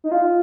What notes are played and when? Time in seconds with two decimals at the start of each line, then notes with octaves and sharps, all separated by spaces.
0.04 D#4
0.12 F4